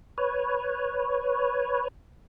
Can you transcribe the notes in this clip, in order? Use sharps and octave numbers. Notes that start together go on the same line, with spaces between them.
B4 C#5